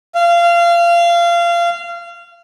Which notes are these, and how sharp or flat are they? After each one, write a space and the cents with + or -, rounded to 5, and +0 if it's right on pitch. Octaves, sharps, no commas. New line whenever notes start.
F5 -25